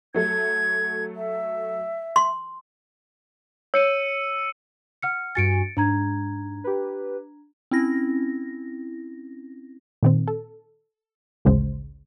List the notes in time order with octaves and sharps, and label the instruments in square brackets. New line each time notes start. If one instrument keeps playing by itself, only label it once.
[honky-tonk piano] F#3 A3 A4 [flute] G#6
[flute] E5
[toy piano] C6
[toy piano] C#5 [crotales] E6 C#7 D#7
[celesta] F#5 F6 C#7
[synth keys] G2 F#4 G#5 [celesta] A6 C#7 D7
[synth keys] G#2 [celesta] D4 A#5 G#6
[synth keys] G4 B4
[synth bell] C4 C#4 E4 A#6
[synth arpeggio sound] A#2 D#3 C4
A4
A1 D2 C#3 G#3 C5